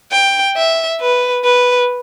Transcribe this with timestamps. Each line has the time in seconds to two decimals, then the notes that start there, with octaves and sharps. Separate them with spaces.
0.12 G5
0.56 E5
1.00 B4
1.44 B4